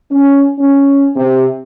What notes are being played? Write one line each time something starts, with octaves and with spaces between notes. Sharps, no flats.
C#4
C#4
C3